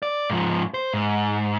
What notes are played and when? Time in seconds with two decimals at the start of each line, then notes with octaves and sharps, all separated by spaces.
0.03 D5
0.30 G#2 F3
0.74 C5
0.94 G#2